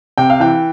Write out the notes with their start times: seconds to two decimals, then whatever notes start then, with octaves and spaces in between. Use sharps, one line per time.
0.18 C3 G5
0.30 F5
0.40 E3 G5